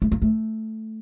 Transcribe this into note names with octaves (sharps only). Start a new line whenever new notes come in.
A3
A#3
A3